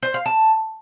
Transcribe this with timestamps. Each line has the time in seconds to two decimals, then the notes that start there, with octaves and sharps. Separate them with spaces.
0.03 C5
0.14 F5
0.26 A5